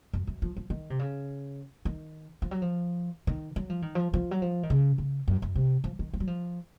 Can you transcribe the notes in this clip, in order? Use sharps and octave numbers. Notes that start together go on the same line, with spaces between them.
F#2
F#2
F3
F3
D#3
C3
C#3
D#3
F3
F#3
F3
D#3
F#3
F3
D#3
F3
F3
F#3
F3
D#3
C#3
C#3
F#2
F#2
C3
F3
D#3
F3
F#3
F3